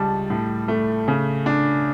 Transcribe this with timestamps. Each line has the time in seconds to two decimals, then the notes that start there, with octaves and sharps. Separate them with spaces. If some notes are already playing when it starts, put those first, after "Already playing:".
Already playing: C#2 G3 A5
0.30 A2
0.68 A3
1.08 C#3
1.46 D4